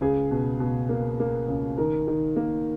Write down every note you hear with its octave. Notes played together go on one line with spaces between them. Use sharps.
C#2 G#4
B2
B2
A#3
A#3
C#2
D#3 A#4
D#3
A#3